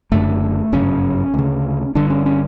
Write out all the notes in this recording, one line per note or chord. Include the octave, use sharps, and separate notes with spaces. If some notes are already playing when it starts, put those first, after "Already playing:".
F#1 F#2 D3 A3
G1 F#2 C#3 C#4
D2 C#3
G1 G2 D3 D4
C#4
C#4